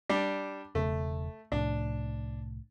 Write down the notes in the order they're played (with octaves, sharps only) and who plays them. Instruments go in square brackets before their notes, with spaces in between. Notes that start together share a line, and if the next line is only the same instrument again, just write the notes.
[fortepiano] G3 D4
[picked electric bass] E1 C#3 [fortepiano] A3
[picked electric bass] C2 A2 [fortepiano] D4